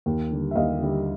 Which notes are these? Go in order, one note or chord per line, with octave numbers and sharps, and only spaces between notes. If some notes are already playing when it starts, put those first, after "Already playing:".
D#2
D3 G3
E5
D#2 D#5 F5
D3 G3